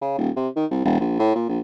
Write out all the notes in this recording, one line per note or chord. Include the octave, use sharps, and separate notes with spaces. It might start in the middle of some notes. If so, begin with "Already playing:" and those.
C#3
D#1
C3
D#3
C2
E1
A#1
A2
A#2
A#1